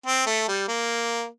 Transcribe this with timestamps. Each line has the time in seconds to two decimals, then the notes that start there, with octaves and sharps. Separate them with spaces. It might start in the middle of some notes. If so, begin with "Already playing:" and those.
0.06 C4
0.27 A3
0.48 G3
0.68 A#3